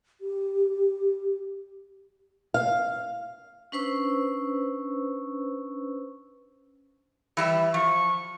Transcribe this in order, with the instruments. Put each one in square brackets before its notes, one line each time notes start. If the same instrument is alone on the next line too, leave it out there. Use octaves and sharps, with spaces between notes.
[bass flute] G4
[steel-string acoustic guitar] F5
[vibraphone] C#4 D4 B4 C5 C#6 E6
[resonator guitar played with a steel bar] E3 G3 E5
[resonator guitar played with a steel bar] F3 [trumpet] C#6